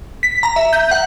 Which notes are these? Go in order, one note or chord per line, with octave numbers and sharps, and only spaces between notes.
B6
A#5
E5
G6
F#5